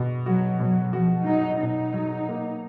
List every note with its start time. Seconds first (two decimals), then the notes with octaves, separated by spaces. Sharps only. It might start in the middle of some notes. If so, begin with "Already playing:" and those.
Already playing: B2 F#4
0.26 F#3 F#4
0.60 B2 F#3
0.93 F3 F#4
1.27 F#3 D#4
1.61 B2 D#4
1.94 F#3
2.29 A#3